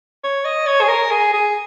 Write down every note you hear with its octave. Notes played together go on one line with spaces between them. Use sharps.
C#5
D#5
C#5
G#4
A#4
G#4
G#4